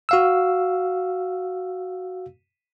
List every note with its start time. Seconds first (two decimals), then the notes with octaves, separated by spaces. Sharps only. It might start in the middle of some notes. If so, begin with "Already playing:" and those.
0.09 F#4 F5 E6